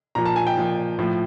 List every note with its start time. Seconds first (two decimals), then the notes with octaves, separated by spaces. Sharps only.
0.15 A#2 F3 A#5
0.26 A5
0.36 G#5
0.47 G5
0.57 A#2 F3
0.99 A2 F3